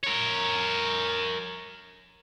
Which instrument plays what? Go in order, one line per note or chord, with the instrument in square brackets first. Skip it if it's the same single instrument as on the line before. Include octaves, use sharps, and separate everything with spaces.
[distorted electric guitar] A#4 C#5